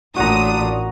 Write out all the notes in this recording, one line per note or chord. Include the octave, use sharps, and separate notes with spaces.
A1 A#2 D4 F#4 A#5 D#6